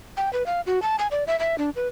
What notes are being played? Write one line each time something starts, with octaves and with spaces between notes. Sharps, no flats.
G5
B4
F5
F#4
A5
G#5
D5
E5
E5
D4
B4